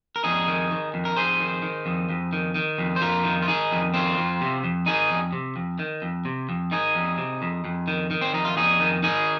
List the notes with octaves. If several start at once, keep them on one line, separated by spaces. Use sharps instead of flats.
A#4
F2 D#4 G#4
D#3
D#3
F2
A#4
F2 G#4 C5
D#3
D#3
F2
F2
D#3
D#3
F2
C5
F2 F4 A#4
D#3
F4
D#3 D#4 G#4
F2
D#3 C4 F4
F2
C3
F2
D#3 D#4 G#4
F2
C3
F2
D#3
F2
C3
F2
D#3 D#4 G#4
F2
C3
F2
F2
D#3
D#3
C4
F2 D#4
F4
F2 D#4 G#4
D#3
D#3 D#4 G#4